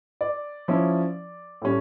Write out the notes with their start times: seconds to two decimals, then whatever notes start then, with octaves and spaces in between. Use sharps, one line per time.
0.21 D5
0.68 F3 C#4 E4
1.62 A2 G3 C#4